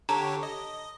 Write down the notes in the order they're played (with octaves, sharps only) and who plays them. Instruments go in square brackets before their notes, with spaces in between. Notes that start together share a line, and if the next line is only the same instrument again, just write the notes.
[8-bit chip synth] D3 G4 C#5 [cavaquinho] A4 [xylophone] A#5
[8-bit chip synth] D#5